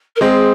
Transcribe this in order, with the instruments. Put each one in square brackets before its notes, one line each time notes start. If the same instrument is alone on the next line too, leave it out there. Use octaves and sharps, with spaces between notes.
[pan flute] A#4
[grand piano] G#3 C4 [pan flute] G#4